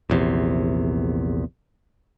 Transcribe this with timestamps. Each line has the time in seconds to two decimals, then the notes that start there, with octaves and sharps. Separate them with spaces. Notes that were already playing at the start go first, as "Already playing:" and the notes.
0.10 A#1 E2 C3